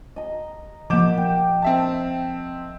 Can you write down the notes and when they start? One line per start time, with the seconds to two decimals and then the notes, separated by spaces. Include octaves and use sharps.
0.16 D#5 A#5
0.90 F3 A#3 D#5 F#5 B5 D6 G6 E7
1.18 G5
1.62 C4 E5 A5